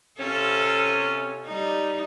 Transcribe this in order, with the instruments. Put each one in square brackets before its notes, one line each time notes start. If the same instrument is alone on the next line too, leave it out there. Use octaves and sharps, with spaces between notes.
[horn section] C3 C#4 [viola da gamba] F4 A4
[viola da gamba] G3 D#4